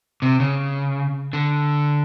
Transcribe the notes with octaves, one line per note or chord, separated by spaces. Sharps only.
C3
C#3
D3